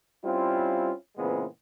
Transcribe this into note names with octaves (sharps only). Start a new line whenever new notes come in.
G3 C4 C#4 E4 F4
A#2 C#3 E3 G#3 B3 C4